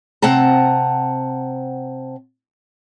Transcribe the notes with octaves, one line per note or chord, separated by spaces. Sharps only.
C3 C4 F#5 A5 A#5